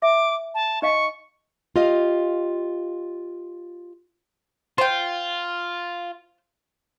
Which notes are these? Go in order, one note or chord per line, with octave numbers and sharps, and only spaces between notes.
E5 D6
A5
D#4 D#5 F5 C#6
F4 G4 D#5 F5
F4 C5 G5